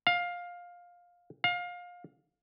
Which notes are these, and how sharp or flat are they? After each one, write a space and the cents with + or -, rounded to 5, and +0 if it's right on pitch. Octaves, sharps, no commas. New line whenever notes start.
F5 +15
F5 +25